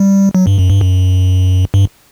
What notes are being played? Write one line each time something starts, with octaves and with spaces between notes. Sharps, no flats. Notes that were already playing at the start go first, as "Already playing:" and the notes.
Already playing: G3
F#3
G2
F#2
G2
F#2
G2